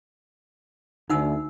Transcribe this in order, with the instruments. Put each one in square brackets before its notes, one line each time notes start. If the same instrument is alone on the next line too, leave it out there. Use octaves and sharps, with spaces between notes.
[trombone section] D2 [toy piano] D#4 F#5 E6